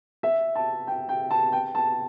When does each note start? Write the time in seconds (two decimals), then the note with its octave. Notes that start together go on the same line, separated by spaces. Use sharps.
0.23 E5
0.55 A5
0.87 G5
1.09 G5
1.31 A5
1.52 G5
1.75 A5